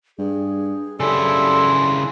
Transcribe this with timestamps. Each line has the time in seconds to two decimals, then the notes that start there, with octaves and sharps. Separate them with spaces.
0.19 G2 G#4
1.00 F#2 C#3 G3 E4 A4 D5 C6